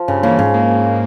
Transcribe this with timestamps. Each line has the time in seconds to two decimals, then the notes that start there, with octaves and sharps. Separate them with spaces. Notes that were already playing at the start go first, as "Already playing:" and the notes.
Already playing: F3
0.08 G2 C#3
0.23 C#3 E3 A#3
0.39 G#2 C#3
0.54 A#3